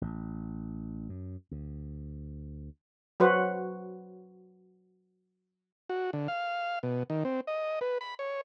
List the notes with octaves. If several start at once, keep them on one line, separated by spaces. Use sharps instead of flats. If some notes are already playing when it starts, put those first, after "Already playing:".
A1
F#2
D2
F#3 F#4 B4 C5
F#4
D3
F5
B2
D#3
C4
D#5
B4
B5
C#5